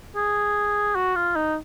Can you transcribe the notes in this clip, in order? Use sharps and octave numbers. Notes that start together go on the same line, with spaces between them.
G#4
F#4
F4
D#4